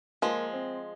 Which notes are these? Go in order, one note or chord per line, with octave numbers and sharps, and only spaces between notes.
F3 G#3 A#3
C4